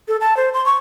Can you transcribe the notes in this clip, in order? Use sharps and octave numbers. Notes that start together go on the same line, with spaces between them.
A4
A5
C5
C6
C#6